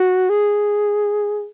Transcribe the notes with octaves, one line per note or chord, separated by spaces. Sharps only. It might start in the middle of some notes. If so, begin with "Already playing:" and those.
Already playing: F#4
G#4